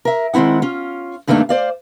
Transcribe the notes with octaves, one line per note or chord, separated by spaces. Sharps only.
A#4 E5
D#3 G#3 C4 E4 F#5
C#4 F4
G2 D#3 A3 A#3 C4 D4
C5 D5 F5